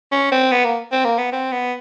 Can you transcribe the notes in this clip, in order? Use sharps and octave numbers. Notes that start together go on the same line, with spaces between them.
C#4
C4
B3
A#3
C4
A#3
B3
C4
B3